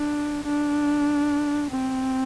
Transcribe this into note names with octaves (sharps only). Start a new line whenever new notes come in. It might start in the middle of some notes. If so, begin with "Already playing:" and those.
Already playing: D4
D4
C4